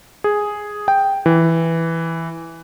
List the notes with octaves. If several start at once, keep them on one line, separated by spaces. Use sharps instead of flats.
G#4
G5
E3